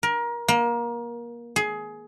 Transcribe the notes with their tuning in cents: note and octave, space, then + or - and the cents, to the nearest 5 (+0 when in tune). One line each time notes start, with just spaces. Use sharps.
A#4 +25
A#3 +25
G#4 +20